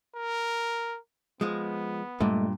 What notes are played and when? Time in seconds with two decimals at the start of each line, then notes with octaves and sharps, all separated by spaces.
0.16 A#4
1.41 F3 G#3 B3
2.20 G2 A#2 G#3 A3